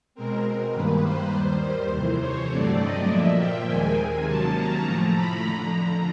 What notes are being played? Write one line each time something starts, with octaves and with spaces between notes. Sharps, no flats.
B2 G#3 C4 A#4
G2 D#3 G3 A#3 B4
C5
D#2 D#3 G3
C5
F2 C3 E3 C5
C#5
G2 D3 F#3 A3 C4 D5
D#5
A#2 F3 A#3 E5
G5
D#2 D#3 G#3 C4 G#5
C3 D#3 F#3 A#3 C#4 A5
A#5
A2 F3 A3
B5
F2 D3 F3 A#5